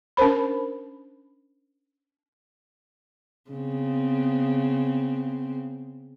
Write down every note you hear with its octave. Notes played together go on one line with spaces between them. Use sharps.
C#4 D4 A#4 C5 B5
C#3 B3 C4